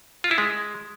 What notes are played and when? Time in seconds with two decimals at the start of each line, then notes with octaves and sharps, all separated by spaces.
0.24 F4
0.31 E4
0.38 G#3